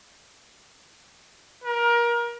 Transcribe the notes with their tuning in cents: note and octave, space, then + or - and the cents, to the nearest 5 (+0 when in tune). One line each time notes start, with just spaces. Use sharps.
A#4 +25